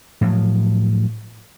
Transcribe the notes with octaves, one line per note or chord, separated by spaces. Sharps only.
A2 F3 F#3